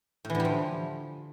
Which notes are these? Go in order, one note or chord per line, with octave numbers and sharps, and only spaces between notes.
A2
E3
D3
G3
F3